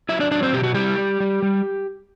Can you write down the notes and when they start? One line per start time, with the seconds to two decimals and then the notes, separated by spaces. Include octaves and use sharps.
0.09 F#3 E4 E5
0.20 D4 D5
0.31 F#3 D4 D5
0.42 C4 C5
0.53 B2 G4
0.64 F#4
0.74 G3 E4 G4
0.98 G3
1.20 G3
1.42 G3